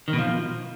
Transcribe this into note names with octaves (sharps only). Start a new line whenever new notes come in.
D#3
B2
F3